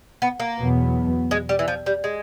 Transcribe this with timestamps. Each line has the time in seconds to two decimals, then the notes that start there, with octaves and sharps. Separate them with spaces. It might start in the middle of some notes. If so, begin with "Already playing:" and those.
0.22 B3
0.40 A#3
0.59 E2 B2 F#3 B3
1.31 G#3
1.49 G3
1.59 E3
1.68 F3
1.86 G3
2.04 G#3